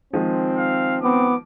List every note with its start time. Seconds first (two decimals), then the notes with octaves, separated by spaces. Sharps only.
0.13 D#3 F3 G#3 C4
0.58 F5
1.03 B3 C4 D6